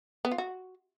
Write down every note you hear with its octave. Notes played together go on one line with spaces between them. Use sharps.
B3
F4
F#4